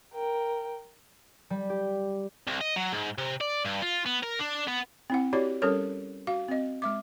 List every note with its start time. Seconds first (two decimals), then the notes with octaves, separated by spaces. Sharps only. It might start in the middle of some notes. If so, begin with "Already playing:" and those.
0.14 A#4 G5
1.50 G3
1.69 G4
2.47 C2
2.61 D#5
2.76 F#3
2.92 G#2
3.18 C3
3.41 D5
3.65 G2
3.82 F4
4.06 B3
4.23 A#4
4.40 D4
4.68 B3
5.10 C4 E4 F#5
5.33 E4 F#4 G4 C#5 D5
5.62 G3 C#4 A4 A#4 C#5
6.27 F#4 F5
6.48 C4 D#5
6.82 G#3 E5 D6